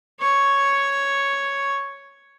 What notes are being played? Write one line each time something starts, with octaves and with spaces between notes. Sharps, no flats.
C#5 C#6